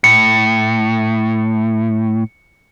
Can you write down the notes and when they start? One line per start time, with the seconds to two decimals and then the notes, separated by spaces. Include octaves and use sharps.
0.04 A2 C#7